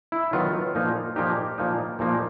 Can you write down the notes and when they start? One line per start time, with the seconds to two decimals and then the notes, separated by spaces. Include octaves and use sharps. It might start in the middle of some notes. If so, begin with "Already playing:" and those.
0.12 E4
0.33 D#3 F#3 B3 F4
0.75 A#2 F3 A#3 D#4
1.16 A#2 F3 A#3 D#4 G4
1.58 A#2 F3 A#3 D#4
1.99 A#2 F3 A#3 D#4